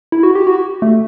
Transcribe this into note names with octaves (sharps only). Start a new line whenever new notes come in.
E4
F#4
G4
F#4
A3